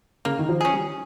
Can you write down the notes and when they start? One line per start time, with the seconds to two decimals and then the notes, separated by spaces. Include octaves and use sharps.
0.25 C#3 A#3
0.39 D#3
0.49 F3
0.61 C#4 G#4
0.73 G3